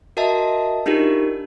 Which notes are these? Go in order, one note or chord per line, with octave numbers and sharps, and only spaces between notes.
F#4 A#4 D#5 E5 A5
D4 D#4 F4 G4 A#4